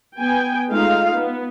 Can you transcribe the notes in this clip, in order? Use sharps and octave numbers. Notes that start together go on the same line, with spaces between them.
B3 G5 G#5
G#3 A3 D#4 F4 F5
B3